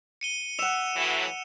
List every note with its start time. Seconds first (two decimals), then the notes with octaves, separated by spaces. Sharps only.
0.21 C#7 D#7 G7
0.59 E5 F#5 C#7 E7 F7
0.96 A2 E3 F#3